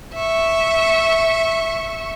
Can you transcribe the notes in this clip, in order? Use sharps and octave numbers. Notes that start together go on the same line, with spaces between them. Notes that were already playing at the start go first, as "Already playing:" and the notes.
E5 C#6